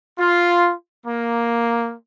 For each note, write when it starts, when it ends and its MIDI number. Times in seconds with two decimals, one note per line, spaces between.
0.19 0.73 65
1.06 1.94 58